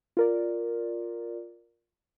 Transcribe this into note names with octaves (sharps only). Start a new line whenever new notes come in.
F4 A#4 D5